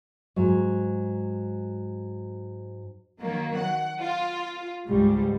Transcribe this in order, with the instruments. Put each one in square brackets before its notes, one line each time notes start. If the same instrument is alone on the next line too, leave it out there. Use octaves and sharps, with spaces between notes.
[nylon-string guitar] G#2 F#3
[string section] D#3 F#3 A#3
F#5
F4
C#2 G#2 G3